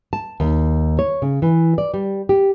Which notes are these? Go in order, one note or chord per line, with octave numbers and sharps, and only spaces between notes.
A5
D#2
C#5
C#3
E3
D5
G3
G4